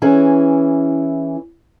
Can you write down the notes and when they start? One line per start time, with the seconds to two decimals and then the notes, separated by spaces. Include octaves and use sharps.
0.02 E3 C#4 E4 G#4